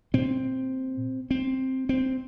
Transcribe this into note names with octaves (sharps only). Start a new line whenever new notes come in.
A#2 C4
C4
C4